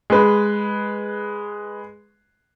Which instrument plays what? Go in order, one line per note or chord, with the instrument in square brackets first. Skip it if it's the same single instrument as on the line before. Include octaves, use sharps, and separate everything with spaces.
[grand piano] G#3 B4